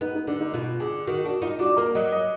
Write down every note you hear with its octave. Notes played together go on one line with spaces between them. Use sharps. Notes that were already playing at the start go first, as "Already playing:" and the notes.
B3 D#4
D#4
D3 D4
D#4
B2 F4
D3 G#4
D#3 F#4
D4 F#4
D#4 F4
D4 F#4
A#3 A#4
F#3 D#5
D#5